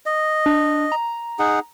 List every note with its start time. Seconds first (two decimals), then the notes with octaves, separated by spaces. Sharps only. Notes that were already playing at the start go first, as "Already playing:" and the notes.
0.06 D#5
0.46 D4
0.92 A#5
1.39 D#4 G#4 F#5